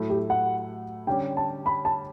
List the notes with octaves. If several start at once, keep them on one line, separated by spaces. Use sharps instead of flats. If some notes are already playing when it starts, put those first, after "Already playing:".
Already playing: A2 F#3 A3 E4
G4
F#5
D3 G3 C#4 G4 G5
A5
B5
A5